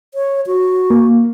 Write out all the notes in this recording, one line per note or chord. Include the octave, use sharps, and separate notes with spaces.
C#5
F#4
A#3